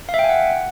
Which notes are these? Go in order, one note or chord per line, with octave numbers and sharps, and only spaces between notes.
F5
E5
G5
G#5
F#5